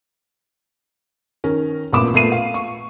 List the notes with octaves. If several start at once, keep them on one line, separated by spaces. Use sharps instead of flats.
D#3 C#4 A#4
A1 A#2 B3 B5 D6 E7
A#2 A3 B3 C7 D#7
F5
C#6